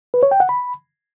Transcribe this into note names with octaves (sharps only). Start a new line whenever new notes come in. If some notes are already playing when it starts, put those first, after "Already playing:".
B4
C#5
G5
F#5
B5